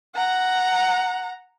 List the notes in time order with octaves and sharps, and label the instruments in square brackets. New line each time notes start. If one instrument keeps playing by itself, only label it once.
[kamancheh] F#5 A#5